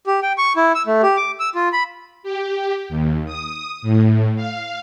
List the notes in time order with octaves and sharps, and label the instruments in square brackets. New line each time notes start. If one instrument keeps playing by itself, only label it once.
[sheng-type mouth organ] G4
G5
C#6
E4
E6
A3
G4
D6
E6
F4
B5
[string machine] G4
D#2
D#6
A2
F5